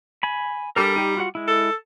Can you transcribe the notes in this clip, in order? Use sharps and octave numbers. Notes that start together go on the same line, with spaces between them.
G#5 B5
G3 D4 A4 A#4
D#4 G4
F4 F#4 F#5
G#3 E4
A4